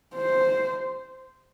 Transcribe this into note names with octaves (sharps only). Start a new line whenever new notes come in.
C5